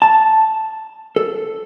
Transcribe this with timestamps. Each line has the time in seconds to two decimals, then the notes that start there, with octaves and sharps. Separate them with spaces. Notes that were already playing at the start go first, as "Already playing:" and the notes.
0.02 A5
1.16 A4